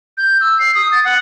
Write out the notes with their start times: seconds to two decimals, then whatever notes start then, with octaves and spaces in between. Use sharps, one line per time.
0.17 G6
0.41 E6
0.59 C7
0.75 D#6
0.92 A6
1.05 F#5